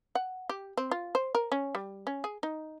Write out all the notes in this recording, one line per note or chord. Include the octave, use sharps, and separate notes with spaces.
F#5
G4
C4
F4
C5
A#4
C#4
G3
C#4
G#4
D#4